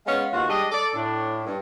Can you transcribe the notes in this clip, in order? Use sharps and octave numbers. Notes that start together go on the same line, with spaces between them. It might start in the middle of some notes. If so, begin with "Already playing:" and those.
G#3 B3 C#4 F5
D#2 B2 F4 F#4
G3 G#3 D4 D#5
A4 D5
A2 D4
G2